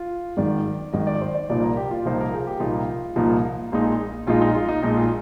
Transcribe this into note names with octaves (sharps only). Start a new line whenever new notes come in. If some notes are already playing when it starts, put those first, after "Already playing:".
Already playing: F4
G#1 G#2 D#3 D5
G#1 G#2 D#3 D#5
D5
C5
D5
C2 A#2 F3 A#3 D#4 D5
A#4
G4
F4
C2 A#2 F3 A#3 D#4 C5
A#4
G#4
G4
C2 A#2 F3 A#3 D#4 F4
C2 A#2 F3 A#3 D#4
A#1 A#2 G#3 D#4
A#1 A#2 G#3 D#4 F4
D#4
F4
D#4
A#1 A#2 G#3 D#4
F4